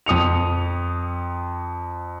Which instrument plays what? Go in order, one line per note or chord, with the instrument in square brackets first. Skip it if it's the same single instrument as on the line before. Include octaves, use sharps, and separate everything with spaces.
[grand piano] F2 D#6 C#7 F7